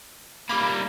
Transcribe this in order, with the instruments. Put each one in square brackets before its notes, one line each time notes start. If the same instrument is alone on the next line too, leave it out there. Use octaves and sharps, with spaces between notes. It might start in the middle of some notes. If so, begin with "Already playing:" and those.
[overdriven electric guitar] G3 A#3 [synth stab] B5 D6